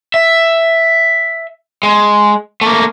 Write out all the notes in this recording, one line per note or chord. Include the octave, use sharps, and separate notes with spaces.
E5
G#3
A3 A#3